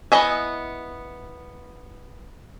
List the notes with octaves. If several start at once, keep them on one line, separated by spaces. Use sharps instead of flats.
B3 E4 D#5 E5 G#5